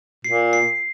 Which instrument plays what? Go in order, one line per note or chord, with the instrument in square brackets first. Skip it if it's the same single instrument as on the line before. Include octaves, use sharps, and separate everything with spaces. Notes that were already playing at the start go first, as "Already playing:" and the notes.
[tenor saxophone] A#2 [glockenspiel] C7
[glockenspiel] C7